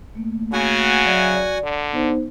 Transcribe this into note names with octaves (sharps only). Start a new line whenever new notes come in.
A3 A#3
C#3 F#4 F#5 G#5
F#3 D5 E5
D5
D3
B3 D#4 C5